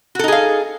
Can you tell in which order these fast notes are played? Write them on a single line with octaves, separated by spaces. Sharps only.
F#4 A4 D#4 G#4 F5